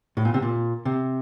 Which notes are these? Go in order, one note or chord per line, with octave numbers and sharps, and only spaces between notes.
A2
A#2
C3
A#2
C3